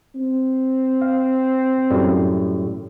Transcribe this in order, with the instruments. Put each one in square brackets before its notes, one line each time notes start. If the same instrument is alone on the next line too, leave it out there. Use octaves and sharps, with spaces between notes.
[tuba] C4
[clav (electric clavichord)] F5
F#2 A2 G3